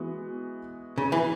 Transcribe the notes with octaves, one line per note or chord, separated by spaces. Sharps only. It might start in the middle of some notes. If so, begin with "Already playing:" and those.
Already playing: E3 G#3 B3 F#4
C#3
E3